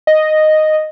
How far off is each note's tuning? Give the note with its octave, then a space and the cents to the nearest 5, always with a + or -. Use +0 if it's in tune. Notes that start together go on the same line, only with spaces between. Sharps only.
D#5 -5